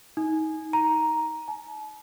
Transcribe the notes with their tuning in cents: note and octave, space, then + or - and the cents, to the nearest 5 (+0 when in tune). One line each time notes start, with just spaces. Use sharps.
D#4 +25
A#5 +5
A5 -40